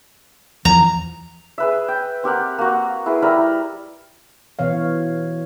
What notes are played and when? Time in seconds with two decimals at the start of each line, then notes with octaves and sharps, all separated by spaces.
0.65 E2 F3 A#5
1.58 G#4 B4 E5
1.88 G5
2.23 C4 G4 A#4 F#5
2.58 A#3 F#4
3.06 E4 G#4 B4
3.22 G3 E4 A#4
4.59 B2 E3 C#5 F5